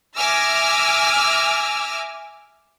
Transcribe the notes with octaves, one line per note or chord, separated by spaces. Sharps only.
E5 G#5 D6 E6 F6 A#6